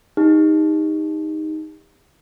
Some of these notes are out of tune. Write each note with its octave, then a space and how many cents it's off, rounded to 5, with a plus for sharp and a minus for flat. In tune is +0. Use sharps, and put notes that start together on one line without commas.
D#4 +5 G4 +40